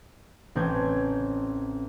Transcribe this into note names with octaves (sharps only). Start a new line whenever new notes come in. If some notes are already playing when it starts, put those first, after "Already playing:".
A1 C4 C#4 G6 G#6